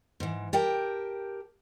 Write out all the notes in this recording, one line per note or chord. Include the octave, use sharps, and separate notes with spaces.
G#2 E3
G4 A#4 G5 A5